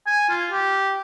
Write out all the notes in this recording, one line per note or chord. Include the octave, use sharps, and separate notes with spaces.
G#5
F4
G4